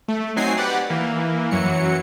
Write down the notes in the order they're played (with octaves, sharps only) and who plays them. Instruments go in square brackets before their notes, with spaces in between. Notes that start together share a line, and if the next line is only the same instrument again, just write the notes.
[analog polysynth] A3
F#3 C4 D#4 G#5 C7
G4 B4 D5 F#5
E3 A#3
F#2 E3 F#3 C#7